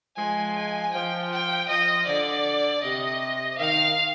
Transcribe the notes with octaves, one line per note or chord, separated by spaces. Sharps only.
F3 G#3 G#5
G#5
F3 G5
G5
F3 D#5
D3 D5
C3 D#5
D#3 F5